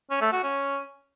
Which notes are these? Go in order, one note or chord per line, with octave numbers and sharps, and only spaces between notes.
C#4
A3
F#4
C#4